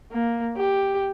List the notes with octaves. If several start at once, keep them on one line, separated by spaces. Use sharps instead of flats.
A#3
G4